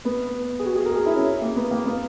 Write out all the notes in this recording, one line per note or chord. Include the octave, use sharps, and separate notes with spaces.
B3
G#4
F#4
G#4
A#4
G#4
E4
C#4
A#3
B3
A#3
B3